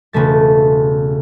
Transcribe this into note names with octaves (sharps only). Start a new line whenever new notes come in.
E1 C#3 A3 A6